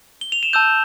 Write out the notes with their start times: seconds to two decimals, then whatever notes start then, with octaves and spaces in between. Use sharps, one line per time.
0.21 G7
0.32 F7
0.43 E7
0.53 A5 E6 G6 E7